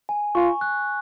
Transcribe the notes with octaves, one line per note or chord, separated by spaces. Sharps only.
G#5
F4 C#6
F#6